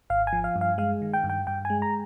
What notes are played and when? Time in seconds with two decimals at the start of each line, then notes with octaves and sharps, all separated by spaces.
0.10 G#1 F5
0.27 G#5
0.33 F3
0.44 F5
0.56 G2
0.61 F5
0.78 G#3 F5
1.02 D#3
1.14 G5
1.24 G2
1.30 G5
1.47 G2 G5
1.65 G#5
1.70 G#3
1.82 A#5